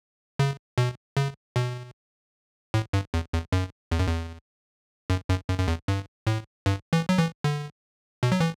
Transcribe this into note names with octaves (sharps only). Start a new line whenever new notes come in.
C#3
B2
C#3
B2
A2
G2
E2
E2
F#2
E2
F#2
E2
F#2
F#2
F#2
F#2
E2
G2
A2
G2
E3
F#3
E3
D3
B2
F#3
E3